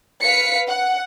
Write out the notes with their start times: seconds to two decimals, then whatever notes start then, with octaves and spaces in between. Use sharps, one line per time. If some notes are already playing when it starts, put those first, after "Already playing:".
0.22 B4 F5 B6 C#7
0.68 F#5